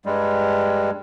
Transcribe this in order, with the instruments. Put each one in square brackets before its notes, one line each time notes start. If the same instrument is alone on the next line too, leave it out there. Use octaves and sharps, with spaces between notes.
[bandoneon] G2 G3 G#3